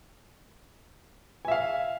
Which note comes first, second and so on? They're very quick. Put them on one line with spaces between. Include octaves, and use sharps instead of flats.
G#5 E5 F5